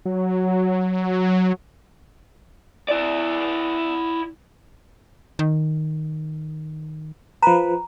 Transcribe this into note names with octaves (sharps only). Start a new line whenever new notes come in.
F#3
E4 D5
D#3
F3 B4 A#5